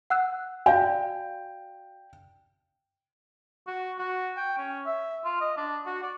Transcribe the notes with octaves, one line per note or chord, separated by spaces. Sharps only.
F#5 E6 F#6
F#4 D5 F5 G5
F#4
F#4
G5
C#4
E5
F4
D#5
D4
F#4
D5